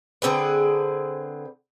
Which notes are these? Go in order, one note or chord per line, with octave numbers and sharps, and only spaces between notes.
D3 C4 G#4 B4